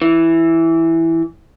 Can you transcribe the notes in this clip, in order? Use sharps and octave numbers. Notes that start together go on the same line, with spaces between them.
E3